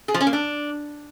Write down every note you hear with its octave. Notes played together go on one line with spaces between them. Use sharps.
G#4
F3
C#4
A#3
D4